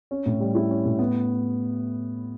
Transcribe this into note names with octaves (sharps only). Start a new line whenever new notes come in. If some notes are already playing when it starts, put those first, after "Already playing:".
C#4
A2
G3
E4
C#4
A2
B3